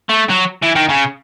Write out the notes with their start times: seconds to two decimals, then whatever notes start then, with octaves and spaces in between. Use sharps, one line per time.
0.09 A3
0.29 F#3
0.62 E3
0.75 D#3
0.89 C#3